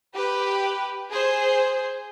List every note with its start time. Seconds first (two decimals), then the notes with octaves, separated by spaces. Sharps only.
0.14 G4 B4
1.12 G#4 C5